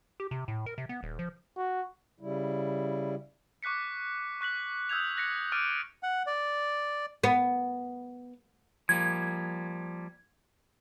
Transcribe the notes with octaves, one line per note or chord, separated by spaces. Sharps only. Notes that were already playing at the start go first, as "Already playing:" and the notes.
G4
C3
A2
A#4
C3
B3
D#1
F3
F#4
C#3 G3 E4
C#6 D6 F#6 B6 C#7
C#6 F#6 B6 F#7
D#6 E6 G6 G#6 F7
F#6 A#6 B6 C#7
D6 E6 F6 A6 D7 D#7
F#5
D5
B3
F3 G3 A#3 G#6